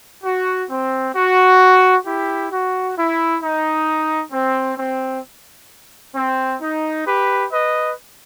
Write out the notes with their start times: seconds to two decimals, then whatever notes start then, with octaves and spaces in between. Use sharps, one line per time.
0.23 F#4
0.69 C4
1.15 F#4
2.05 E4 G4
2.51 F#4
2.97 E4
3.42 D#4
4.32 C4
4.78 C4
6.15 C4
6.61 D#4
7.06 G4 B4
7.51 B4 D#5